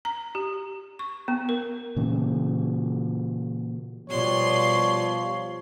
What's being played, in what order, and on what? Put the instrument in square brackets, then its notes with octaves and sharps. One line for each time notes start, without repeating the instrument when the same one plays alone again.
[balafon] A#5
G4
C#6
B3
A#4
[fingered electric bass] A#2 C#3 E3
[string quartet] B2 D5 C6 [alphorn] F3 [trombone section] G3 G4 [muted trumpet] C#5